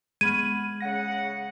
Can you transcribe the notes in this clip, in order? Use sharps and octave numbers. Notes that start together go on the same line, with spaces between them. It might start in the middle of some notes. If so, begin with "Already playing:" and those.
G#3 B3 B5 G#6 D#7
C#3 F#5 A#6